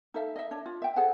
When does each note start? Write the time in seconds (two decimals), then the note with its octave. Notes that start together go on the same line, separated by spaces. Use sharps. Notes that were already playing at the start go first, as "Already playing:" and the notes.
0.14 D#4 A4 E5 F5
0.36 D#5 E5
0.51 D4 C#5
0.66 F4
0.82 E5 G5
0.96 G#4 A4 C5 F#5